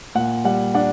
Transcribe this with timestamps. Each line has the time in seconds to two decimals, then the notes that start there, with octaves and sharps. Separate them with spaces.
0.15 A#2 F#5
0.45 G3 F#5
0.74 D4 F#5